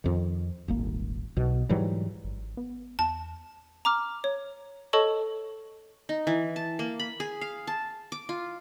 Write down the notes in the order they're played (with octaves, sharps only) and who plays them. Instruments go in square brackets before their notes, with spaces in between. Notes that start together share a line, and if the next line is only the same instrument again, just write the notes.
[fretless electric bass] F2 D#3
D#1 G#1 A#3
B1 B2
G#2 E3 F#3 G3
[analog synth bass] G#1
B3
[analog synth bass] E2 [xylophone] A5
[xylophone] A#5 D6 F6
C#5
A4 C#5 D#5 A5 C#6
[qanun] D#4
E3
A5
A#3
B5
G#4
F5
A5
D6
F4